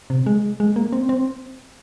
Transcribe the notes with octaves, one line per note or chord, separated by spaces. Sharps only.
C3
G#3
G#3
A#3
C4
C4